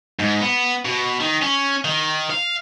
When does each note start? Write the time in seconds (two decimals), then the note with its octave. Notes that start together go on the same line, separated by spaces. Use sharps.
0.20 G#2
0.41 B3
0.85 B2
1.20 D#3
1.42 C#4
1.85 D#3
2.30 F5